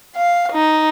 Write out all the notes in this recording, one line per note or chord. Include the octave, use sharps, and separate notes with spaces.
F5
D#4